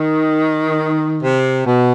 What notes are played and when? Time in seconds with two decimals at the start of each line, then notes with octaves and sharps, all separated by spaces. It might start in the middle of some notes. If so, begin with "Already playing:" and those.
Already playing: D#3
1.23 C3
1.66 B2